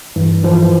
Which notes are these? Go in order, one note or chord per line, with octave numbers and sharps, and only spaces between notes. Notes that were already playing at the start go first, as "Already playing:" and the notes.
G2 E3
E3 F3